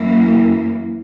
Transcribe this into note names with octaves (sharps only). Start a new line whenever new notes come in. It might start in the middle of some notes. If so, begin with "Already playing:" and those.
Already playing: F#2 E3 A#3